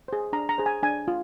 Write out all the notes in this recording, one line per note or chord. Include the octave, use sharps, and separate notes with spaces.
G#4 C5
D4 A#5
A#5
G#4 C5
G#5
D4 G#5
F4